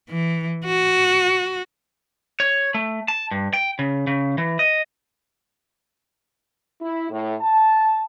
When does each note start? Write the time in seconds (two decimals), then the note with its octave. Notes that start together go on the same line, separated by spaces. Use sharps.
0.10 E3
0.66 F#4
2.40 C#5
2.74 A3
3.08 A5
3.31 G2
3.53 G5
3.79 C#3
4.07 C#3
4.38 E3
4.59 D#5
6.82 E4
7.10 A2
7.42 A5